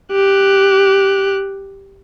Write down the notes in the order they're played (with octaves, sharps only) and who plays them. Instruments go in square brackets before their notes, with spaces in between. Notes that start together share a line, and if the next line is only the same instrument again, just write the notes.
[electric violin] G4 F#6